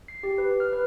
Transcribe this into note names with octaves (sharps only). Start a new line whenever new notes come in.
C7
G4
B4
F6
B4